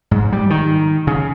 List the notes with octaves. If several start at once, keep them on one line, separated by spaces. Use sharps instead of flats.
G#2
G3
D#3
C#3